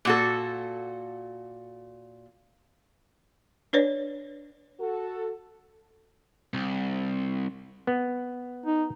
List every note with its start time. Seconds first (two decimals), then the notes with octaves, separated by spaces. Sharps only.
0.05 A#2 F#4 A4
3.73 D4 B4 C#5 D5
4.81 F#4 A4
6.53 C2
7.87 B3
8.66 D#4